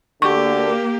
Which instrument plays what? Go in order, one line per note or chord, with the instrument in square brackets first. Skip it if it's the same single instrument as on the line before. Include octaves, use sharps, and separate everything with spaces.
[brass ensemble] D2 D3 [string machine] A#3 [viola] G4 [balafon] C#6